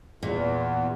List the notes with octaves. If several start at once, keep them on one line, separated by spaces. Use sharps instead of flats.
E2 A#2